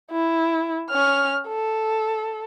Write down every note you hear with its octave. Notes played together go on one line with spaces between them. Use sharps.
E4
C#4 F6
A4